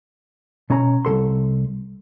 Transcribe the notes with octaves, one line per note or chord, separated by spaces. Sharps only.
B2 C#4 C#5 A#5
C2 C#3 A4 C6